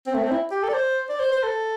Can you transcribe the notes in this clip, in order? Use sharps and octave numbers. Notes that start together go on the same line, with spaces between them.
C4
A3
C4
E4
G4
A4
D5
C5
D5
C5
C5
A4